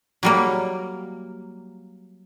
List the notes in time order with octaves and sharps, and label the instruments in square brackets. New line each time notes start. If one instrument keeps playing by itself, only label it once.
[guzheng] F#3 G3 A#3